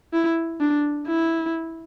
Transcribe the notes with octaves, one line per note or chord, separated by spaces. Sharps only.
E4
D4
E4